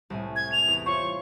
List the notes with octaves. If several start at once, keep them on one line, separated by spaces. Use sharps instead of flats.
C2 A2 G#5
G#6
F7
E2
F4 C5 C#5 C#6